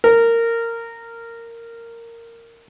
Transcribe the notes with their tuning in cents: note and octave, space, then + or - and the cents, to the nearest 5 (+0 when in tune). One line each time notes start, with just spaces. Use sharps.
A#4 -15